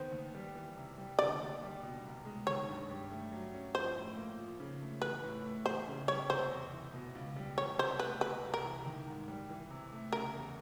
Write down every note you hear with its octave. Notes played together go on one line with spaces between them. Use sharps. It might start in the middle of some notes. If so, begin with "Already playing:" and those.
Already playing: D#3 B3 C5
D#2
G3
E3
C3
G3
D3 D5
D#2
G3
B2
C2
G#3
D#3 C#5
G2
G3
A3
F#3
C#4
F3 C5
A2
A#3
F3
C#3
A3
E3 B4
A2
A3
E3 C5
C#3
G3 C#5
C3 C5
E2
E3
B2
C#2
G3
E3 C#5
C3 C5
A3 B4
C3 B4
C2
A#4
E3
D#3
G#2
G3
E3
C3
A3
C#3 A#4
E2